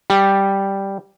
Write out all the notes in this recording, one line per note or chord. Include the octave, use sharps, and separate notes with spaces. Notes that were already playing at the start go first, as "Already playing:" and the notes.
G3